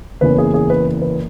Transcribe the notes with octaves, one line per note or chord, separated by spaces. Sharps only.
F#1 E2 C#3 E3 C#4 B4
G#4
G#4
B4
B4